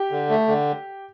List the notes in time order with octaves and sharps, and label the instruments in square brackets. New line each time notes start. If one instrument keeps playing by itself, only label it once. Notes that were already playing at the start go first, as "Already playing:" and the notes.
Already playing: [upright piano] G4
[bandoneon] D3
A3
D3